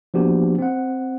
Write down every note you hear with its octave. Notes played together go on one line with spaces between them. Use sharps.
F3 A#3 B3 D4 F#4 G4
C4 F#5